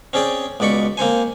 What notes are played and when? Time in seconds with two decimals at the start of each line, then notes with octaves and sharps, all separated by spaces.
0.13 C4 C#4 G#4 D5 G5
0.60 C#2 B2 D5 B5 C#6
0.97 A#3 C4 C5 G#5